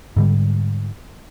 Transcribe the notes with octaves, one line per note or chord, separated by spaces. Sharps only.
G#2 D3 G3